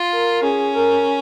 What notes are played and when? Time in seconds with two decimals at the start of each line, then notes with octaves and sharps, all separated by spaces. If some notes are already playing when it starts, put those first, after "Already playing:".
Already playing: F4
0.11 A#4
0.43 C#4 G#4
0.75 A#4